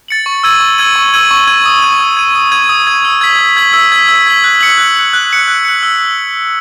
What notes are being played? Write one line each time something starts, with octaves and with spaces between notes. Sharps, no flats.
A6 C#7 F#7
C#6
E6 G#6 D#7 F#7
C#6
E6 G#6 D#7 F#7
C#6
E6 G#6 D#7 F#7
C#6
E6 G#6 D#7 F#7
D#6
G#6 D#7
D#6
G#6 D#7
D#6
G#6 D#7
D#6
G#6 D#7
E6
G#6 B6 F#7
E6
G#6 B6 F#7
E6
G#6 B6 F#7
E6
G#6 B6 F#7
F#6
C#7 F#7
F#6
C#7 F#7
F#6
C#7 F#7
F#6
C#7 F#7
E6